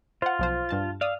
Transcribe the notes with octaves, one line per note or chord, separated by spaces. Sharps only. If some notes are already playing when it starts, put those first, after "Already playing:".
F4 C5 F#5
B1 F3 C5
G2 A5 A6
D5 F5 D#6 E6